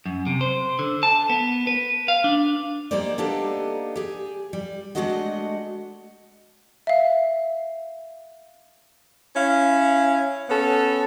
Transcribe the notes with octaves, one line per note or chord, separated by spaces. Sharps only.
F#2
C3
C5
D3
A5
B3
B4
F5
D4
G3 G#3 A#3 D#4 C5 D5
A#3 B3 D4 D#4 G4 A4
G4 G#4
G3
G#3 A3 D4 F#4 D#5 F#5
E5 F5
C#4 E4 F5
B3 C#4 A4